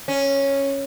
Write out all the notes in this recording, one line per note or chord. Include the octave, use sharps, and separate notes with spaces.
C#4